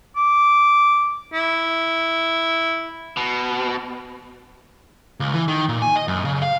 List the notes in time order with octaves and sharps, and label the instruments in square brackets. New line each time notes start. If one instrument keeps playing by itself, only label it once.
[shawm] D6
E4
[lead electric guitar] B2
C#2
E3
D#3
A#2
G#5
D#5
F#2
C#3
F5